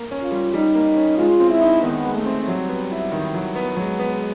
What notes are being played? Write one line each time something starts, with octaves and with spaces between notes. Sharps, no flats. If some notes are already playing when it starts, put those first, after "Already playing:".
Already playing: A#3
C#4
F4
G3
G3 D#4
A#3
C#4
G#3 F4
C4
E4
D#4
D#3 B3
G#3
A3
C4
F#3 G3
B3
E4
D#3
F#3
B3
F#3 G#3
B3